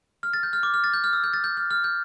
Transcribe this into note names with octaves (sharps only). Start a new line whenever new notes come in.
F6
A6
G6
F6
D6
F6
A6
G6
F6
E6
G6
A6
G6
F6
F6
G6